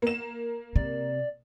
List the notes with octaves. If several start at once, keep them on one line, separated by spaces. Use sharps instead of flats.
A#3 E7
C3 D5